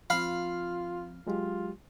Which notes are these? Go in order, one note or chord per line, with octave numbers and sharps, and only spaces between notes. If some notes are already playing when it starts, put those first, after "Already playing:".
F3 C4 F4 F5 B5
F#3 G#3 F4 G4